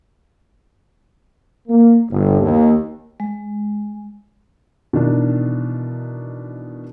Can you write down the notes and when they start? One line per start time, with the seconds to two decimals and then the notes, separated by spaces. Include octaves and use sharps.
1.68 A#3
2.10 G1
2.41 D#2
3.20 G#3
4.93 B2 D#3 E3 D4